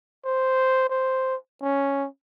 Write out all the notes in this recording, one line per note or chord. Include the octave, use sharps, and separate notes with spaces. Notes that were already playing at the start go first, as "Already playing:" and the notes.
C5
C5
C#4